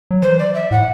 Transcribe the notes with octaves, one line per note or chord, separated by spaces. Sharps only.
F#3
E3 C5
D5
E5
A2 F#5